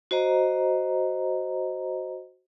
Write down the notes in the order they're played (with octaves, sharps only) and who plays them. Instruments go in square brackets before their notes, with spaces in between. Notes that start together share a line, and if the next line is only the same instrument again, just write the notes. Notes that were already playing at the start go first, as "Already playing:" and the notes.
[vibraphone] F#4 C5 D#5 A#5